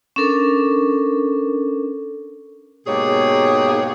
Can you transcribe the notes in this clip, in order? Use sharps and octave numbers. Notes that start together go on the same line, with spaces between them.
C#4 D4 A4 A#4
G#2 B2 A#3 G4 G#4 C#5